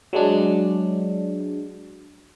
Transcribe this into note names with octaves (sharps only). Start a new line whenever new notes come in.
F#3 G#3 D4